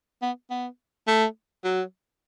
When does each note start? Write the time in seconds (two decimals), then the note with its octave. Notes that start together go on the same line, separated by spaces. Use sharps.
0.22 B3
0.50 B3
1.07 A3
1.64 F#3